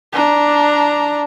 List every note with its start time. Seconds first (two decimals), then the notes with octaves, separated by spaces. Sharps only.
0.13 D4 A#5